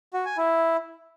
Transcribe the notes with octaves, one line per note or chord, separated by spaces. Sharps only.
F#4
G#5
E4